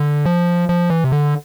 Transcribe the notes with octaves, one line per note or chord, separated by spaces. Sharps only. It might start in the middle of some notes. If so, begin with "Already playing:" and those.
Already playing: D3
F3
F3
E3
C3
D3